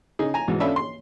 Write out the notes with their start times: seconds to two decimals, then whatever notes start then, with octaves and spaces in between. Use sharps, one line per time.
0.19 C#3 D#4 G#4
0.34 G#5 A#5
0.48 G#2 B2 E3 G#3
0.60 C#4 D4 F4 A4 E5 B5
0.76 C6